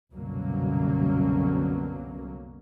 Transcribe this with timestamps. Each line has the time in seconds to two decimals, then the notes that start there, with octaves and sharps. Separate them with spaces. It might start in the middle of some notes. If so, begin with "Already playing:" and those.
0.12 C2 F#2 B2 D3 F#3 A#3